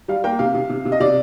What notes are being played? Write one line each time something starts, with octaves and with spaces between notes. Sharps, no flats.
G3 F5
A#3 G5
C3 F5
C3
C3
C3
D#5
C3 D5